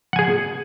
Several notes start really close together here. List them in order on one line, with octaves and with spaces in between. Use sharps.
F#5 G#5 G#4